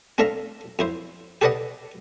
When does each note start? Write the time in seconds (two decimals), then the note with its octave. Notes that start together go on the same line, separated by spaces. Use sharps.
0.18 C4 D4 A4 E5 F5 A#5
0.79 F2 E4 C5
1.41 G4 A4 B4 D5 D#5 F#5